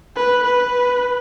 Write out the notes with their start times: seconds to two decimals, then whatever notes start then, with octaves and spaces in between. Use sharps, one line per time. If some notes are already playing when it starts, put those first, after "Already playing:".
0.16 B4
0.44 B4